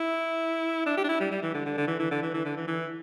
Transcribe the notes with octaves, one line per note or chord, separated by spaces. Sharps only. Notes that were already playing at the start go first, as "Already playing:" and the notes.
Already playing: E4
D4
G4
D4
E4
G3
G3
E3
D3
D3
D3
E3
E3
D3
E3
E3
D3
E3
E3